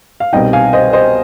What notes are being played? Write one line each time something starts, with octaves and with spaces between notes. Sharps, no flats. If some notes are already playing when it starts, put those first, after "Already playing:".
F5
C2 B2 G3 C4 D#4 D#5 G5
F5 G#5
C5 D#5
C5 D#5